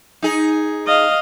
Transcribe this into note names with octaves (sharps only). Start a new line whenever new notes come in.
D#4 G#4
D#5 F5